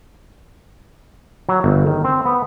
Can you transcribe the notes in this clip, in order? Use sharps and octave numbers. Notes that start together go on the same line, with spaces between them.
F#3
G1
D#3
C4
B3